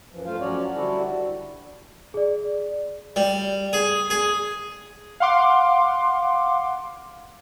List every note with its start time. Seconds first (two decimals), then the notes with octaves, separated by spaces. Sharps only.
0.12 F#2 E3 F3
0.26 G2 F3 A3 F4 C5 F5
0.40 F3 F#3 C#4 F#4 C#5 D5
0.75 D3 G3 E4 F#4 A4
2.14 G#4 D5
3.16 G3
3.73 G#4
4.10 G#4
5.20 F5 F#5 C6 D6